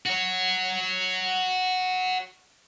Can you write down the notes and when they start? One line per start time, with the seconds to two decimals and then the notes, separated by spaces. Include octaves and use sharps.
0.06 F#4 C#5